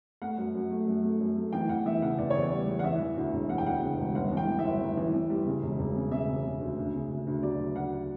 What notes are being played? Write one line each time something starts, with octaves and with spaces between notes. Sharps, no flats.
A3 F#5
F#2
F#2
A3
F#2
A3
F#2
A3
E3 G5
E2 F#5
E3 E5
C#3 F#5
E2 D5
E2 C#5
D5
G3
E2
F#5
E3 E5
E3
D2
E1
E3 F#5
G5
D2 F#5
C#3
E1
G1 F#5
E3 G5
E3
E5
G1
G1
E3
E3
G3
C#3
E1
E1
C#3
C#3 E5
E1
C#3
D2
D2
C#3
D2
D2
F#3 D5
D2
D2 F#5